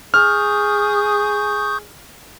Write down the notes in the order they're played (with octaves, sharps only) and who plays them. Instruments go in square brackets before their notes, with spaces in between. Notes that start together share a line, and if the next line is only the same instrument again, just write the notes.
[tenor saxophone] G#4 [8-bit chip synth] C#6 D#6 G6 [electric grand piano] F6